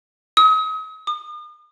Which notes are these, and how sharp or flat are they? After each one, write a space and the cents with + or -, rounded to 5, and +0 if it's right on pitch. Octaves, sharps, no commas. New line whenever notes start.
D#6 +40
D#6 -45